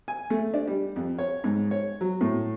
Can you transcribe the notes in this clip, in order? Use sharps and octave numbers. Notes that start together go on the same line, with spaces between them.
G#5
A3
D4
G3
F2
C#5
G#2
C#5
F#3
A2